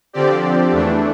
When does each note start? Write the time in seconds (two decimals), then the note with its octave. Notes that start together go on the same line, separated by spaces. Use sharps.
0.13 D3 F3 C4 G4 D5
0.72 E2 E3 A3 D4